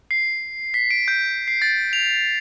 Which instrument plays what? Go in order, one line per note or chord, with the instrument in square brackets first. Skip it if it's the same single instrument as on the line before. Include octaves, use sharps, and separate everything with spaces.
[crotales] C7
B6
D7
G6
C7
A6
F7